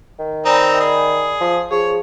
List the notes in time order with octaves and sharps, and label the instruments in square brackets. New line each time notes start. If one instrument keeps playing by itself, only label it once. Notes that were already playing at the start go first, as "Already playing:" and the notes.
[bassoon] D#3
[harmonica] C4 D#4 [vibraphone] D5 G#5 B5
[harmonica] G#4
[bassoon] F3
[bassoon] F3 [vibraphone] G#4 [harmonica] C#5